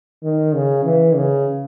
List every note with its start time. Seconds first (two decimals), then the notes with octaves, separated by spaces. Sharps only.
0.24 D#3
0.55 C#3
0.85 E3
1.16 C#3